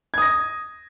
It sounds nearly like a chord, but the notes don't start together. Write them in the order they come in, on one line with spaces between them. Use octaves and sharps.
G#6 D#6 A#6